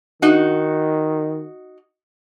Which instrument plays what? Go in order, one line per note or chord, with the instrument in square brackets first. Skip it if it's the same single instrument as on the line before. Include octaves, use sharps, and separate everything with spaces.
[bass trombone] D#3 [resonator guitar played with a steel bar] D#4 F#4